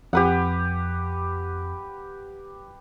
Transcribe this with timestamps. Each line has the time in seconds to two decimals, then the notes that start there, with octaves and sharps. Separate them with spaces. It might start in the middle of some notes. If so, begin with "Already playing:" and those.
0.13 F2 G4 B4 F#5